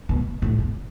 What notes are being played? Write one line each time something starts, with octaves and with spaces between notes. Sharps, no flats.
B2
A2
B2